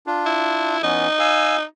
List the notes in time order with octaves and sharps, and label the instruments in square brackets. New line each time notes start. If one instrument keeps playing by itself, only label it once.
[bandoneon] D4 F4
[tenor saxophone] E4
[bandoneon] E3 B3 C#4 [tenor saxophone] D#4
[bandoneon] F5 G#5 E6